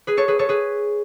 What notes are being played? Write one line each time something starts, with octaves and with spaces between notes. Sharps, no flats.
G#4 B4
A4 C#5
G#4 B4
A4 C#5
G#4 B4